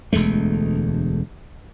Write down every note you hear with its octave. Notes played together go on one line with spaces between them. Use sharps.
E1 D2 G#3 A3